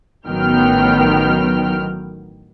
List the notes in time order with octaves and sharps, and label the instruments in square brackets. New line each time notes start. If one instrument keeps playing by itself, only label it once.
[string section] A1 D#3 F#3 B3 G5 F6